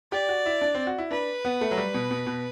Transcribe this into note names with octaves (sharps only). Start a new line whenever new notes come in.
G4 D5
F#4
E4
D4
C4
F#4
E4
D4 B4
B3
A3
F#3
G3
B2
B2
B2